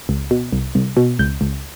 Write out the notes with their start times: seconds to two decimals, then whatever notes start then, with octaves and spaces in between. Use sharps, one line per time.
0.09 C#2
0.31 B2
0.52 C2
0.75 C2
0.97 B2
1.19 C#2 G6
1.41 C#2